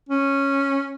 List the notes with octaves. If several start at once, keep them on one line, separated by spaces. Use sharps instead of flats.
C#4